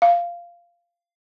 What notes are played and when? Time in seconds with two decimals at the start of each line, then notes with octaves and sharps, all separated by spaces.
0.02 F5